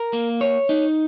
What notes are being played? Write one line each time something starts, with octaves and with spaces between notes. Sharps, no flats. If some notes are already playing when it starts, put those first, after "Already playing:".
Already playing: A#4
A#3
C#5
D#4